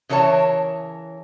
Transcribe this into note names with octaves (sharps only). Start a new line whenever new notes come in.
C#3 E3 A#4 C#5 A5